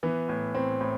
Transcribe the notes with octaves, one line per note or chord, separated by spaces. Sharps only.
E3 B3
A2
A2 C4
A2